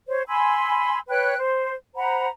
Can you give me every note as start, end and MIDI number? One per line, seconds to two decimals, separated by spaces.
0.08 0.21 72
0.08 0.21 73
0.28 0.99 80
0.28 0.99 83
0.28 0.99 84
0.28 0.99 88
1.08 1.36 71
1.08 1.36 73
1.08 1.36 79
1.08 1.36 90
1.38 1.74 72
1.96 2.27 72
1.96 2.27 78
1.96 2.27 82
1.96 2.27 83